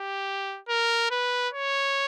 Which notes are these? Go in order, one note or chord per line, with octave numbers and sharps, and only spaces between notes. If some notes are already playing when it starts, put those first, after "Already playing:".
Already playing: G4
A#4
B4
C#5